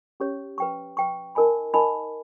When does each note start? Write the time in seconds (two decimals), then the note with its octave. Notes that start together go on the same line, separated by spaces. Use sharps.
0.20 C#4 G4 C#5
0.58 B4 G5 C#6
0.97 B4 G5 C#6
1.35 D#4 A#4 D#5 G#5 B5
1.74 D#4 A#4 D#5 G#5 B5